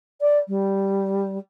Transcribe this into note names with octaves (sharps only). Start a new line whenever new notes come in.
D5
G3